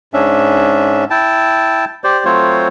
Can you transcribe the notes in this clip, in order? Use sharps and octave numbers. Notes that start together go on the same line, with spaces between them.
G#2 C#4 D4 E5
E4 G5 A5
G4 C5 D5
F#3 A3 C4 F4 C5 C#5